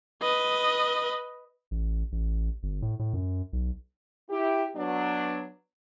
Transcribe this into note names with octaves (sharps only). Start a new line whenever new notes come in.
B4 D#5
A1
A1
G1
A2
A2
F#2
B1
E4 G4
F#3 B3 D4